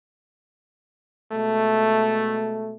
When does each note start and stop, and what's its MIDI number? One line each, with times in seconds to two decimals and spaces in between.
1.32 2.77 47
1.32 2.77 56
1.32 2.77 57